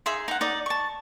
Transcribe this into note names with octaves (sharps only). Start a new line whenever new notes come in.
D#4 G#4 E5 C6
D#4 F#5
D#4 D5
A5 C#6